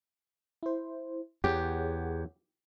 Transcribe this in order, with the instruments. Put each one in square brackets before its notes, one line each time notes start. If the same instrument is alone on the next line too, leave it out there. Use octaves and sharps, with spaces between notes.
[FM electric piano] E4 C5
[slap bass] E2 [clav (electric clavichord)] G4 [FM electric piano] G#4 C#5 F#5